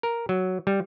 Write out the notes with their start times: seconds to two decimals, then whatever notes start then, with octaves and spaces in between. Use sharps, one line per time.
0.03 A#4
0.29 F#3
0.67 G3